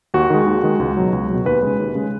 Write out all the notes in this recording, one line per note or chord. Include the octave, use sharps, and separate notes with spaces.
D#2 F#4
D#3 G#3
D#2
D#3 G#3
C#2
B2 F#3
C#2
B2 F#3
D#2 B4
C#3 G#3
D#2
C#3 G#3